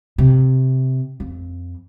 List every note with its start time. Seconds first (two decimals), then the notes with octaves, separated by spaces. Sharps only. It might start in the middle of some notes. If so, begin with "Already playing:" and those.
0.18 C3
1.20 F2